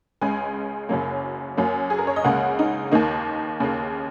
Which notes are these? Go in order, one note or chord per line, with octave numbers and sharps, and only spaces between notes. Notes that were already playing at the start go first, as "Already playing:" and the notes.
C#2 C#3 G#3 G#5
F#1 F#2 F#3 A#3
F#2 F#3 A#3
G#4
A#4
C#5
D#5
C#2 C#3 A#3 F#5
D#4
D#2 D#3 A#3 D#4
D#2 C#3 A#3